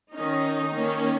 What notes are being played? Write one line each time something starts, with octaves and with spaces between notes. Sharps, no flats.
D#3 C#4 D#4
D#3 A#3 C#4